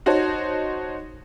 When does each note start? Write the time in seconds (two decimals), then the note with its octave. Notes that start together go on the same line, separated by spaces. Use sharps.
0.06 D#4 F#4 C5 C#5 A5